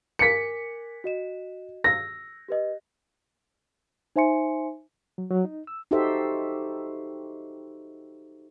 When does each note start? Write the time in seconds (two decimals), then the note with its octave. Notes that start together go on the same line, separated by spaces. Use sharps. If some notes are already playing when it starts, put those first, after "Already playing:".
0.19 A#4 G#5 D6 B6 C#7
1.04 F#4 D#5 E7
1.84 E6 A#6
2.48 G4 B4 D#5
4.16 D#4 C5 E5 G#5 C6 C#7
5.18 F#3
5.30 F#3
5.44 D#4
5.67 E6
5.91 D#4 F#4 G4 A4 C5 E5